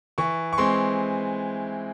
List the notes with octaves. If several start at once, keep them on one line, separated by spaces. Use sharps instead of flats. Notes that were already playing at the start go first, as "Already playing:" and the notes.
E3 C#6
C#6
G#3 C4 C6